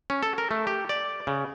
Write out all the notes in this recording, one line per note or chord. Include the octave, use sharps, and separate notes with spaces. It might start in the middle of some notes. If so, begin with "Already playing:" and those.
C#4
A4
A#4
A3
G4
D5
C#3